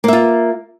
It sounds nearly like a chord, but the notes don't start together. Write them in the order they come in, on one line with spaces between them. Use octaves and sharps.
A#3 E5 F4